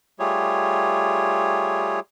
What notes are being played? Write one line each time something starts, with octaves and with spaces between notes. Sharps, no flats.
G3 A3 F4 G4 G#4 C#5